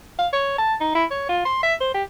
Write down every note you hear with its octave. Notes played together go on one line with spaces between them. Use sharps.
F5
C#5
A5
D#4
E4
C#5
F4
C6
E5
C5
G4